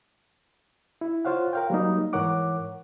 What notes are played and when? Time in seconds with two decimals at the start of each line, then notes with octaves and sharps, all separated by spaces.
1.01 E4
1.25 F4 C5 C#5 F5 F#5
1.53 A#4 F5 G5
1.70 F#3 G3 A#3 D#4
2.13 G#2 E3 A#4 C#5 F#5 D6